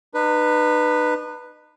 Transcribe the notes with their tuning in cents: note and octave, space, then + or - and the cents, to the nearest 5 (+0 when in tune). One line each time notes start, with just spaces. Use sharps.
D#4 -40 B4 +0